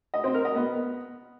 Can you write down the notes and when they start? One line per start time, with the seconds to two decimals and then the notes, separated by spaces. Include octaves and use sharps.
0.14 D#5
0.24 C4
0.34 A#4
0.45 D#5
0.55 B3